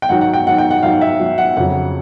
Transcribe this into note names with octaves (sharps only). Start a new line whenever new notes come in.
G5
G#2 D#3 F#3 F#5
F#5
G5
G#2 D#3 F#3 F#5
G5
F#5
G#2 D#3 F#3 F5
E5
G#2 D#3 F#3
F#5
F2 C#3 F#3 F#5